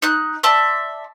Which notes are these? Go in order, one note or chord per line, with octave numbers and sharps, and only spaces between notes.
D#4 F#6
D5 E5 A5 C6